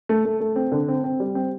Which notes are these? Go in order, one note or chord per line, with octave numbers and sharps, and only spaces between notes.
A3
A3
A3
C4
D3
C4
C4
G3
C4